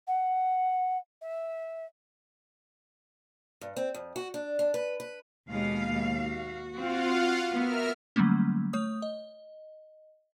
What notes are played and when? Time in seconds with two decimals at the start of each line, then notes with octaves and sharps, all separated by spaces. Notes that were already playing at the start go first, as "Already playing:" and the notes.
0.07 F#5
1.21 E5
3.61 G2
3.77 C4
3.94 F2
4.16 F#4
4.34 D4
4.59 D4
4.74 B4
5.00 B4
5.49 D#2 B2 G#3 F5
6.14 F#4
6.76 C4 F4 F5 F#5
7.53 B3 A#4 E5 F6
8.16 D3 F#3 G3 A3 A#3 C#4
8.73 A3 C#5 D#6
9.02 D#5